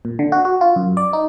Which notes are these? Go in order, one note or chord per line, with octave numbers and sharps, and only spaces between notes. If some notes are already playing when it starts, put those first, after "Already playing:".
A#2
D3
F#4
F#4
F4
F#2
D5
D#4